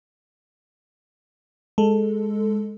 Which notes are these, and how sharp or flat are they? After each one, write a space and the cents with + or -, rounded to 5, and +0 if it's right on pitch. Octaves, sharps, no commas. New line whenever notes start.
G#3 +0 A4 +0